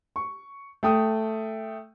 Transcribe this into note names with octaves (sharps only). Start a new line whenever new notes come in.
C#6
A3 G5 D#6